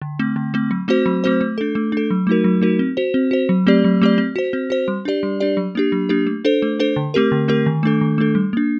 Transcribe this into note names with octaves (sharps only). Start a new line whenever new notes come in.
D3
A3 C4
D3
A3 C4
F#3
A3 C4 F#4 C5
F#3
A3 C4 F#4 C5
A3
D4 A4
A3
D4 A4
F#3
A3 D#4 F#4 A#4
F#3
A3 D#4 F#4 A#4
C4
F#4 C5
C4
F#4 C5
F#3
A3 C4 G4 D5
F#3
A3 C4 G4 D5
C4
F#4 C5
C4
F#4 C5
G3
D4 G4 D5
G3
D4 G4 D5
F#3
A#3 D4 G4
F#3
A#3 D4 G4
A3
D4 A4 C5
A3
D4 A4 C5
D3
A3 C4 G4 A#4
D3
A3 C4 G4 A#4
D#3
A3 D4 A4
D#3
A3 D4 A4
G3
A#3 D4